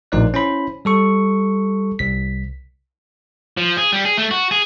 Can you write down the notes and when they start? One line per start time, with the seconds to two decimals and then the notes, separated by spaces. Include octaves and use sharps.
0.12 A#1 A2 D#4 C5 D5 F#6
0.34 C#4 E4 C5 B5
0.85 G3 A4 C#6
1.99 C2 B6
3.57 F3
3.77 G#4
3.93 G3
4.05 G#4
4.18 A3
4.31 F#4
4.51 G#4